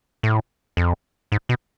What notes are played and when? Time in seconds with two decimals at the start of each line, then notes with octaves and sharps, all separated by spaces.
0.23 A2
0.77 F2
1.32 G#2
1.49 B2